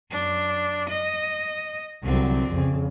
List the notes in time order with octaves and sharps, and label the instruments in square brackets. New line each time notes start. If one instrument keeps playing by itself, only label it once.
[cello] F#2 D4
D#5
[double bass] C2 F#3 [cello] D3 C4
[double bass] F2 C#3